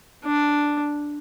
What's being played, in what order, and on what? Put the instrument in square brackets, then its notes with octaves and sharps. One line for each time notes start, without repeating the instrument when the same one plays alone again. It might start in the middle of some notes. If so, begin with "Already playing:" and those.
[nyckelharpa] D4